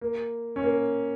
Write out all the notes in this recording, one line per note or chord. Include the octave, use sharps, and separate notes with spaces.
A#3
C#4
A#3